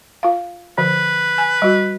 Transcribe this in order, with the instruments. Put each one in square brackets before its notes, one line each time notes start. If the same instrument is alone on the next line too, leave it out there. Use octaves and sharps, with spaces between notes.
[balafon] F4 F5
[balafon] D3 F3 C5 [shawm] B4
[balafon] G#5
G3 F#4